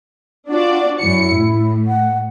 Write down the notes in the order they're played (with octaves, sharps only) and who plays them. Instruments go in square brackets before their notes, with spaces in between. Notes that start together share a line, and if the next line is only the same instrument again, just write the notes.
[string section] D4 F#4 D5 [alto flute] F4
[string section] F#2 C#7 [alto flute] E4
[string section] A2
[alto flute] F#5